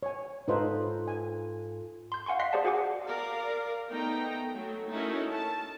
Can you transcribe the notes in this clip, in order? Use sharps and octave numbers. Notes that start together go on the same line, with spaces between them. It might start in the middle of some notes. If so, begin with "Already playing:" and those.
C#5 G#5
G#2 D#4 F4 A4 B4 C5
G#5
C6 G6
F5 F#5 G#5 C6 C#6
D#5 F5 C6 F#6 B6 C7
G4 G#4 C5 D5 F#5 A5
F#4 G#4 C5 F#5 G#5 D6
A#4 D5 F5
A3 B3 D#4 G5 A#5
F#3 A3
A3 C#4 D#4 E4 F#4 A#4
A5